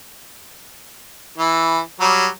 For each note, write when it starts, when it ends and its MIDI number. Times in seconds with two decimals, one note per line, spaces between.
1.38 1.80 52
2.00 2.27 54
2.00 2.27 55